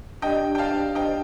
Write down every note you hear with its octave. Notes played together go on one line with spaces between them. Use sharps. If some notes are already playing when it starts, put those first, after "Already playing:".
D4 G4 D5 D#5 G5
G5
F5 A5
D#5 G5